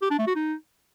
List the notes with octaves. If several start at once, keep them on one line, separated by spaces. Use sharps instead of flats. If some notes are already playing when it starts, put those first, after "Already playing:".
G4
D4
A3
F#4
D#4